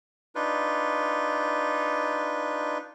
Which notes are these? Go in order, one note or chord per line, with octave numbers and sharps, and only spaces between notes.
D4 D#4 F4 B4